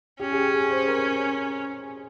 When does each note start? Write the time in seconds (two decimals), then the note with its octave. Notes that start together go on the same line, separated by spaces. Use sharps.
0.20 C#4 G4
0.32 G#4
0.36 G4
0.54 G#4
0.71 C5
0.88 A#4